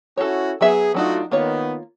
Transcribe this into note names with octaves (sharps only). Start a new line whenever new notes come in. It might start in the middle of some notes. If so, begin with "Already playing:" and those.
C#4 E4 F#4 A4 C#5
F#3 B3 G#4 E5
F#3 A3 D4 D#4 F4 F#4
D#3 A#3 B3 F4 C#5